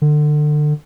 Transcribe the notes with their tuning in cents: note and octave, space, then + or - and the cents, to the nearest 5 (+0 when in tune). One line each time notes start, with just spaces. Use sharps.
D3 +30